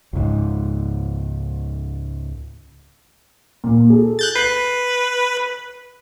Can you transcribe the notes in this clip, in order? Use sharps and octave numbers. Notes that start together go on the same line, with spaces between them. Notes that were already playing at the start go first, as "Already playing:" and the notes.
C#2 G#2
A#2
G#4 A4
F#6 G6 A6
B4 C7